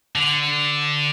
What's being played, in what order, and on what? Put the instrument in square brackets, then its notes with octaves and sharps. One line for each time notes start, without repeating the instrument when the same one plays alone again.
[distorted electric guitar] D3